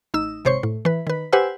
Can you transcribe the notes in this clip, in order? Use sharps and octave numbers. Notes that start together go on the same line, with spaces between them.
A1 D#4 E6
G#1 C3 C5 C#5 C#6
A2
E3 B4
D#3 B4
G4 B4 C5 F#5 G#5 E6